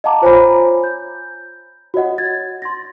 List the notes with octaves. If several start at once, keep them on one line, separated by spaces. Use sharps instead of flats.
D#5 F5 F#5 A5 A#5 D6
F4 C5 C#5 G#5 A#5 B5
G6
F#4 C#5 D#5 F#5
G#6 A6
C6 A6 A#6